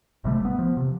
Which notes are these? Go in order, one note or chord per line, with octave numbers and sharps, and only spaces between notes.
G#1 C3 G3 A3
B3
F3
C3